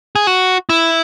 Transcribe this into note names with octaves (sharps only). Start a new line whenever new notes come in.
G#4
F#4
E4